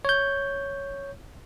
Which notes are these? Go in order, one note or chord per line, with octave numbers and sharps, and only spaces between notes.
C#5 G6